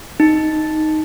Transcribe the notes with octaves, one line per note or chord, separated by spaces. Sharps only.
D#4